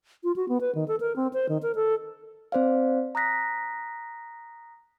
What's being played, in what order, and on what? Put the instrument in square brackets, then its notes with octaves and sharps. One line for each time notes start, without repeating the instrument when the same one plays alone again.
[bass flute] F4
F#4
B3
B4
D#3
A4
A#4
C4
C5
D#3
A#4
A4
[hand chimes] C4 C5 D5 F5
A#5 D#6 F#6 A#6 B6